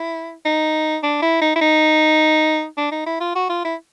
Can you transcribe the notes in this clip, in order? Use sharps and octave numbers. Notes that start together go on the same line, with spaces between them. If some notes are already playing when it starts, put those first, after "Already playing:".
Already playing: E4
D#4
D4
E4
D#4
E4
D#4
D4
D#4
E4
F4
F#4
F4
E4